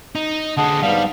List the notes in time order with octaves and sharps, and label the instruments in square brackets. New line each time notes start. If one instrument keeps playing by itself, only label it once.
[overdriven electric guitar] D#4
[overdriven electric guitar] D3 G#3 [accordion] F#5 A5 D#6
[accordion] G#2 B3 F5 [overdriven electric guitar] G3